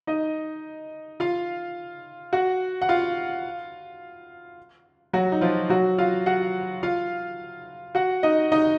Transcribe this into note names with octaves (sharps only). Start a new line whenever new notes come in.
D#4 D#5
F4 F5
F#4 F#5
F#5
F4 F5
F#3 F#4
D#4
F3 F4
F#3 F#4
F4 F5
F#4 F#5
F4 F5
F#4 F#5
D#4 D#5
D#4 D#5